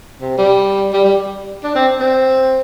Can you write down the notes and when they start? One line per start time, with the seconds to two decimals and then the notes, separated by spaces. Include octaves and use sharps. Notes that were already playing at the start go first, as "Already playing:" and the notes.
0.21 C3
0.38 G3
0.93 G3
1.04 G3
1.64 D4
1.75 C4
2.00 C4